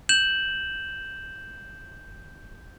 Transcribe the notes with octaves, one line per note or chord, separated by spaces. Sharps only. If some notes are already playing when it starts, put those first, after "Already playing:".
G6 E7 F#7